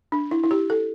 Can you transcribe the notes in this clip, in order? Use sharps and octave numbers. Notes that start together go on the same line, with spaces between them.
D4
E4
E4
G4
A4